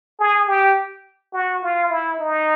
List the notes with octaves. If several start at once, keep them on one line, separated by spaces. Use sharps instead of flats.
G#4
G4
F#4
F4
E4
D#4